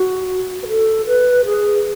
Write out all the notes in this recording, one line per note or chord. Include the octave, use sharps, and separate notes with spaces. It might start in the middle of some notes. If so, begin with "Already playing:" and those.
Already playing: F#4
B4
A4
B4
G#4